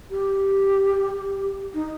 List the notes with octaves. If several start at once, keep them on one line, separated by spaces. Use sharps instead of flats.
G4
D#4